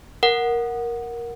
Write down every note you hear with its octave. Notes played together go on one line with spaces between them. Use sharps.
A#4 F#5